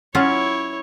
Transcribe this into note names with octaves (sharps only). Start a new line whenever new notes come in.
F#3 C#4 E4 F4 C#5